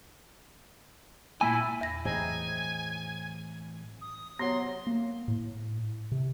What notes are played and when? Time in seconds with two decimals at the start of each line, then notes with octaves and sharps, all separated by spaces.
1.41 A#2 A#3 E4 G#5
1.81 E2 A#6
2.05 A2 E3 F#3 C4 D#4 G#4 G#5
4.01 D#6
4.39 C3 F#3 B3 C6
4.87 A#3
5.28 A2
6.12 C3